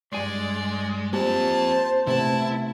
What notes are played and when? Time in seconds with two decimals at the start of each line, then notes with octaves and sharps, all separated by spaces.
0.13 G2 G#3 D5 G#5 C6
1.13 A#3 C4 F4 G4 C5 G#5 A5
2.07 C3 A3 B3 E4 A5